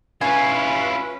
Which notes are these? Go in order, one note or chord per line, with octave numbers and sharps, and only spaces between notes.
C#4 E4 F4 B4 G#5